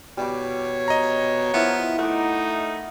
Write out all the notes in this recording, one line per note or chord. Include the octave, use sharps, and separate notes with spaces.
B2 G3 G4 C#5
D#5 A#5
F3 B3 E4 A#4
A3 D#4 F#5 D6